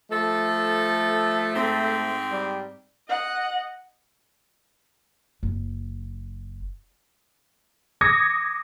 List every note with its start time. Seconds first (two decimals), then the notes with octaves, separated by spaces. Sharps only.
0.11 F3 A3 A4
1.55 G#2 C4
2.31 G3
3.08 D#5 F#5
5.43 F#1
8.01 D6 D#6 G#6 A#6 C#7